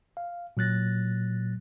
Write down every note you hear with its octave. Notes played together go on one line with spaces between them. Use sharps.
F5
A#2 F#3 F#6 A6 A#6